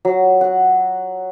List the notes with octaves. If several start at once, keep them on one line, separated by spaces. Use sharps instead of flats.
F#3
F#5